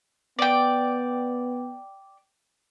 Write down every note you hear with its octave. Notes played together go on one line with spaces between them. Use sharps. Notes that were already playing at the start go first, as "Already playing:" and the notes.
B3 D5 G5